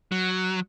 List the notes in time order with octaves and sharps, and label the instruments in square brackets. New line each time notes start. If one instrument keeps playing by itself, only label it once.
[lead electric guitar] F#3